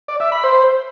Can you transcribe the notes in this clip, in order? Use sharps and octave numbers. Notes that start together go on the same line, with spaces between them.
D5
E5
B5
C5